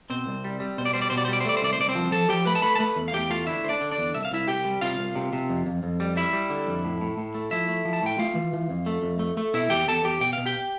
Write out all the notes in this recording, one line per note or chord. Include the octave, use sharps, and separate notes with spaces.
B2 C4 C5
C2
G3
G3
B2 C5
D5
G3 C5
D5
B2 C5
D5
C5
G3 D5
C5
A3 D5
C5
C2 D5
C5
C2 D5
C4 C5
F3
F3 A4 A5
F3 G4 G5
A3 B4 B5
A5
A3 B4 B5
A5
A3 B4 B5
E2
F5
E2 G4 G5
A3 F4 F5
D3 E4 E5
D3 D4 C5 D5
D3
D4 D5
E2
C2 E5
F5
C2 E4 E5
C2 G4 G5
G3
C3 F4 F5
C2
C3
C3
F2
F2
F2
G3
G3 E4 E5
G3
D3
F2
A2
A2
A2
A3
F3 E4 E5
A3
F3
A5
A2 G5
A3 F4 F5
E3
E3
F2
A3
F2
A3
A3
B2 E4 E5
E2 G4 G5
E2 A4 A5
E2 G4 G5
B2 G5
B2 F5
G4 G5